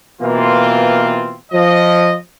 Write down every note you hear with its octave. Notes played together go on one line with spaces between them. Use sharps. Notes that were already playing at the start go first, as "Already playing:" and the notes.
B2 E3 A#3 C4 F4
F3 D#5